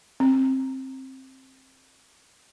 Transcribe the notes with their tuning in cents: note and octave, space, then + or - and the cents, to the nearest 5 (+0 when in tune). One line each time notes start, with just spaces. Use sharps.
C4 +15